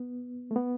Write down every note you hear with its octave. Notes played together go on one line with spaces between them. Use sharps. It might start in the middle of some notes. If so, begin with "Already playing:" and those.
Already playing: B3
A3
B3